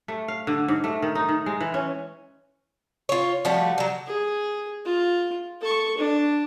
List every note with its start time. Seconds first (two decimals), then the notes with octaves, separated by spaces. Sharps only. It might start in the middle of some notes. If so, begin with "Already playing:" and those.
0.08 A3
0.28 F5
0.47 D3
0.68 G#2
0.84 A3
1.02 D#3
1.15 D#4
1.29 D#3
1.46 G#3
1.60 E3
1.74 C#4
3.09 F4 C#5
3.45 F3 G3 A3 F#4
3.78 F#3 G3
4.07 G#4
4.85 F4
5.61 A4 C#6
5.98 D4